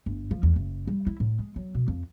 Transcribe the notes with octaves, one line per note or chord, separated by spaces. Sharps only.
G1
F3
E2
F#1
G3
E4
A2
G#3
F#3
B2
F2